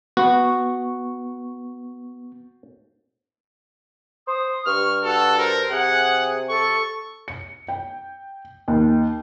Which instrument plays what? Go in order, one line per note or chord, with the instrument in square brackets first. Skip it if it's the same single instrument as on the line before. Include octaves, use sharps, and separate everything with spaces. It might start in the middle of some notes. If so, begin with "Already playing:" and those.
[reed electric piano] B3 C#6 [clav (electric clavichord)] F#4
[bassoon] C5 [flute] D#6
[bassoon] G2 [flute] C#6 [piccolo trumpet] F6
[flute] F#4 [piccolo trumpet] A4
[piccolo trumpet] A#4 [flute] C5
[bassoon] C3 [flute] G#4 [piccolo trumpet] F#5
[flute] A4 [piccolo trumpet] C#6
[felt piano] C#7
G5
D#2